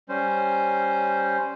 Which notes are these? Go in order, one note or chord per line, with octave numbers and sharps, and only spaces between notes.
G3 C#4 C5